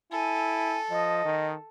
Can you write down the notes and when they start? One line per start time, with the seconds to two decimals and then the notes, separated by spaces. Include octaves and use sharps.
0.12 E4 A4 G#5
0.90 F3 D#5
1.25 D#3